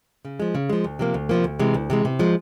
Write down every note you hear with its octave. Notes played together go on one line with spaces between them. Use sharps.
C#3
F3 G#3
C#3
F3 G#3
D2
C3 F3 A#3
D2
C3 F3 A#3
D2
C3 E3 G#3
D2
C3 E3 G#3
C3
F3 G#3